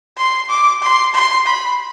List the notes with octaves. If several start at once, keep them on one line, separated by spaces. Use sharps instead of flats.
C6
D6
C6
C6
B5